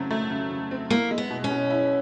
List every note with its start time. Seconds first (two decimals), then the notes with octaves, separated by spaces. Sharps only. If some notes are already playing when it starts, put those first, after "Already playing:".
Already playing: C#3 F#3 A3 C4
0.11 A3
0.30 C#3
0.51 C#3
0.71 C4
0.90 A#3 E4
1.11 G#3
1.18 B3
1.30 B2
1.44 C#4
1.50 B2
1.70 E4